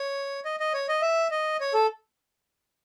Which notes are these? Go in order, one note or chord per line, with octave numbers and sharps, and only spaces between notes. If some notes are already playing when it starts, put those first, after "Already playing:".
Already playing: C#5
D#5
D#5
C#5
D#5
E5
D#5
C#5
A4